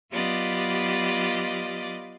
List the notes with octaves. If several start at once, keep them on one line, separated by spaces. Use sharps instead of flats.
F#3 B3 F4 G4 D5 D#5